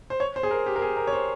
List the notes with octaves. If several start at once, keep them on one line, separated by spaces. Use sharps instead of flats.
C5
C#5
C5
G#4
A#4
G4
A#4
G#4
A#4
C#5
C5